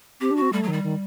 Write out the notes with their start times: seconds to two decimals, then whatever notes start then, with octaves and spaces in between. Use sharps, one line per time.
0.21 C4 G4
0.31 D4
0.36 F#4
0.42 C4
0.52 G3 A3
0.63 F#3
0.68 D#3 G3
0.83 D#3